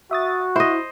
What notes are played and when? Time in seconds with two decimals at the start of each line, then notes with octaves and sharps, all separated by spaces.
0.11 F#4 E5 D#6 A6
0.56 E4 C5 D#5